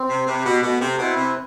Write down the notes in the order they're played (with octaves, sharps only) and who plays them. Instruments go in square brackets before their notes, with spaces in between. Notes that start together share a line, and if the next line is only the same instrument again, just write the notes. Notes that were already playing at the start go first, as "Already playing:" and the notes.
Already playing: [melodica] C4
[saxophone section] C3
[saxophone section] C3 [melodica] G4 B4
[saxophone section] B2
[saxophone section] B2 [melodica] A3
[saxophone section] C3
[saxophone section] B2 [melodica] C4 E4 B4
[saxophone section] C3